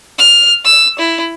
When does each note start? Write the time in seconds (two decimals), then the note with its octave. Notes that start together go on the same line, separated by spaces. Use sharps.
0.19 F6
0.65 E6
0.99 E4